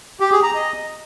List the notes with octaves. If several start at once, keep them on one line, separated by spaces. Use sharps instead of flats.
G4
G#4
A#5
D#5